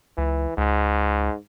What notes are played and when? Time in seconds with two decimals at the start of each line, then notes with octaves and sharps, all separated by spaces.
0.18 C#2 E3
0.57 C#2 G#2